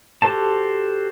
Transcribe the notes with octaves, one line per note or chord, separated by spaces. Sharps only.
F#4 G4 A4 C5 A5